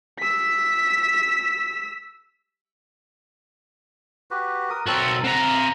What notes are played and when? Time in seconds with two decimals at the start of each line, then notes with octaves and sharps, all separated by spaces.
0.19 E6 B6
4.31 F#4 G4 B4
4.70 A#4 D#6
4.87 B1 C4 F#4 A4 A#4
5.24 C4 F#5 A#5
5.41 F5